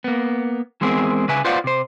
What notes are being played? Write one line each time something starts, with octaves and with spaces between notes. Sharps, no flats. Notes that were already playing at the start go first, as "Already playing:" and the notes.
A#3 B3
E3 G#3 B3 C4 G#4 A#4
C#3 B4 E5 G#5
F4 B4 C5 D5 F5 F#5
C3 C5